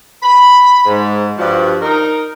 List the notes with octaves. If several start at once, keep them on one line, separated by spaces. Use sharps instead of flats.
B5
G#2
G2 F3 F#4
D#4 A#4